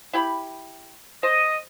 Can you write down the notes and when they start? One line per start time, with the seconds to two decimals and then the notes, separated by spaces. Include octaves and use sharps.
0.13 E4 G4 B5
1.23 C5 D#5